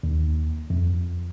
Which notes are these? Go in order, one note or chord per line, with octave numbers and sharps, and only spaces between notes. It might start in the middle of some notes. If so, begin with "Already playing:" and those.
D#2
F2